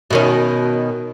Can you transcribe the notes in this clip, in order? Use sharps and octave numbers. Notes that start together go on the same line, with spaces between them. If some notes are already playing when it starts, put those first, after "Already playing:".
B2 D#3 C#4